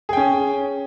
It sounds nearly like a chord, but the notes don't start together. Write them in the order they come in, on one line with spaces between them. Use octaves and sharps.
G#4 G5 C#4